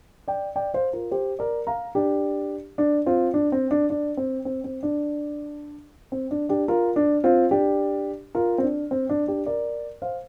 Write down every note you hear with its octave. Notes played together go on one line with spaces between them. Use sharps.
D5 G5
D5 G5
C5 F5
F4 A#4
G4 C5
A#4 D5
F5 A#5
D4 G4
D4
C4 F4
D4
C4
D4
D4
C4
C4
C4
D4
C4
D4
D4 G4
F4 A#4
D4
C4 F4
D4 G4
F4 A#4
C4
D4
C4
D4
D4 G4
A#4 D5
C5 F5